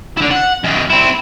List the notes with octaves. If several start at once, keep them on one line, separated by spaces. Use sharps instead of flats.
D3 E4
F#5
F#2 D#3
C4 E4